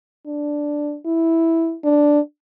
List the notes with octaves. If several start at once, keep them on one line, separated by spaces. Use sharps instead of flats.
D4
E4
D4